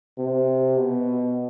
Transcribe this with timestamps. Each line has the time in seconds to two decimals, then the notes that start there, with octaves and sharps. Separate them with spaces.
0.18 C3
0.77 B2